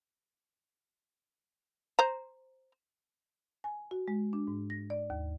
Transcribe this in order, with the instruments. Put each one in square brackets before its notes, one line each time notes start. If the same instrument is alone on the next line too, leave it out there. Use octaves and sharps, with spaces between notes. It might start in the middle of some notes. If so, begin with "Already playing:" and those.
[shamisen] C5 A#5
[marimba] G#5
F#4
G#3
D4
G#2
A#6
D5
D#2